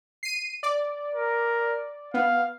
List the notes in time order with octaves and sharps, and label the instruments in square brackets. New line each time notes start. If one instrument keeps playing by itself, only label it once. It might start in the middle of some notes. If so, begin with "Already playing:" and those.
[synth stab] C7 D#7
D5
[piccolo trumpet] A#4
[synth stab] B3 [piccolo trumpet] F5